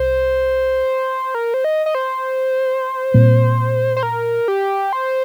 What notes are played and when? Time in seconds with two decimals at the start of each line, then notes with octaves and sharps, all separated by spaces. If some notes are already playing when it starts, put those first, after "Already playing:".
Already playing: C2 C5
1.35 A#4
1.54 C5
1.64 D#5
1.86 D#5
1.95 C5
3.14 A#2 G3 C4
3.97 C5
4.03 A#4
4.48 G4
4.93 C5